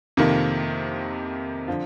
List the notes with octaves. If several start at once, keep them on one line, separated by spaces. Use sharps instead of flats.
F2 C3 D#3 A#3
D3 F3